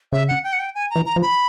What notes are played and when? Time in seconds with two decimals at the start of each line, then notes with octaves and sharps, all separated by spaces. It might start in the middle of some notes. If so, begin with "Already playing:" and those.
0.12 C#3 E5
0.28 F#5
0.44 G5
0.53 F#5
0.59 G5
0.75 G#5
0.90 A#5
0.96 E3
1.06 A#5
1.16 F3
1.22 B5